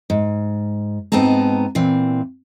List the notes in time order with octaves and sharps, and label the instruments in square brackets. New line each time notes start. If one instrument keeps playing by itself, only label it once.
[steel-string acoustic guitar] G#2
G#2 B3 C4 D#4 A5 A#5
A#2 E3 C4